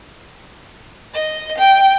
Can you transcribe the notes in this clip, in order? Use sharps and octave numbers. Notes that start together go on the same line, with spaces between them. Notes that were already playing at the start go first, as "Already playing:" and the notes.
D#5
G5